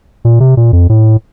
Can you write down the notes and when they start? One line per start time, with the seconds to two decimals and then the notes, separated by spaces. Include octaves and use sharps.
0.25 A#2
0.40 C3
0.57 A#2
0.73 F2
0.89 A2